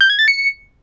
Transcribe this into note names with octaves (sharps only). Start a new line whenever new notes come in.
G6
G#6
A6
C#7